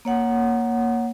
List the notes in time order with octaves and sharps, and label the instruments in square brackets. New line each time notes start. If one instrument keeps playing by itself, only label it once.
[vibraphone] A#3 C#5 F#5